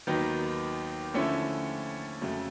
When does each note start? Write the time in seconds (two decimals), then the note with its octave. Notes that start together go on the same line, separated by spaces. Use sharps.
0.07 D#2 D#3 F#3 B3 D#4
1.14 D3 F3 A3 C#4 E4
2.21 F2 C#3 F#3 A3